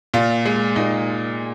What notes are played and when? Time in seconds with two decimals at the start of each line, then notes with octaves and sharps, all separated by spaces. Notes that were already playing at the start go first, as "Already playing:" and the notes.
0.14 A#2 F4
0.46 G#3
0.76 A#2 D#4